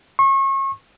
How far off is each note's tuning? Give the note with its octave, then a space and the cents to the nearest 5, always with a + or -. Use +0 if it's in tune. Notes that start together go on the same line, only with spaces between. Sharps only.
C#6 -35